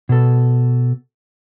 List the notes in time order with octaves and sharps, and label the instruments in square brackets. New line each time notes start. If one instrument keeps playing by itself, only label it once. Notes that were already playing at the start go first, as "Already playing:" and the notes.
[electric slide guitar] B2 A4